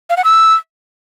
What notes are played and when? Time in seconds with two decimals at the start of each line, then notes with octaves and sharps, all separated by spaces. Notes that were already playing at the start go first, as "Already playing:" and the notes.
0.10 F5
0.17 F#5
0.24 E6